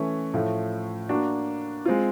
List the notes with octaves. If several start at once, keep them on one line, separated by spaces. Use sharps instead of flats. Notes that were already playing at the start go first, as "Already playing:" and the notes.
Already playing: E3 A3 C#4
A2 F3 A3
A#3 D4 F#4
G#3 C4 F4